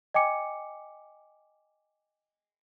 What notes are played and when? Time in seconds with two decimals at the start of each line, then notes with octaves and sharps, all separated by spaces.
0.14 D#5 G5 G#5 D6 C#7